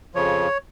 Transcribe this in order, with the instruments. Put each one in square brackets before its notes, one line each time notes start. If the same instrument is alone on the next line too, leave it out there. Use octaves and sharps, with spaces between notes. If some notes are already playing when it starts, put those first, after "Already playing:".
[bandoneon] F2 C#3 F3 C#5